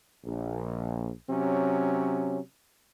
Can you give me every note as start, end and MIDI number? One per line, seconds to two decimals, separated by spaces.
0.25 1.09 34
1.28 2.38 48
1.28 2.38 54
1.28 2.38 61